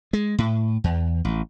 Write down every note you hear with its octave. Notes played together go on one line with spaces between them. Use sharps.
G#3
A2
E2
A1